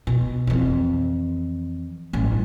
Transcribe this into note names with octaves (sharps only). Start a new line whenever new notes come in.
B2
F2 E3
A1 G2